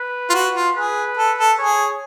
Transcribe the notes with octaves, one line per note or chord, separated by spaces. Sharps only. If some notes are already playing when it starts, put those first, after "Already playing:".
Already playing: B4
F4
F#4
F4
G#4 B4
A4
A4
G#4 C#5